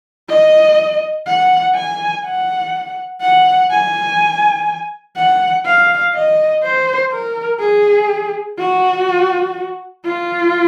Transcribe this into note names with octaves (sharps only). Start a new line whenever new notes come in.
D#5
F#5
G#5
F#5
F#5
G#5
F#5
F5
D#5
C5
A#4
G#4
F#4
F4